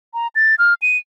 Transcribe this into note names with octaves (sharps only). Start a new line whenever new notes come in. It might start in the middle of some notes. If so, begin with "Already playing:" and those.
A#5
A6
F6
D#7